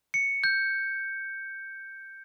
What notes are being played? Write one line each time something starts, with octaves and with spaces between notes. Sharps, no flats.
C#7
G6